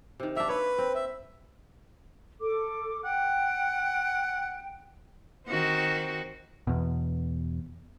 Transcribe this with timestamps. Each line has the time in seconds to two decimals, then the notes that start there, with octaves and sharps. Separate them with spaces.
0.20 C3 D#3
0.37 A#3 D4 E5
0.48 B4 C#5
0.78 C4
0.95 E5
2.41 A4 D6
3.04 F#5 G5
5.48 D#3 C4 F#4
6.67 E2 B2